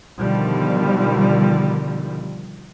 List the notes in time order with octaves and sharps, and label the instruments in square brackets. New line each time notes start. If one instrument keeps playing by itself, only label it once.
[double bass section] B2 D3 D#3 F3 G3